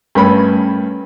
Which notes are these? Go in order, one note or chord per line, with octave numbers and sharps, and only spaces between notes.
G2 A3 C#4 A#4 B5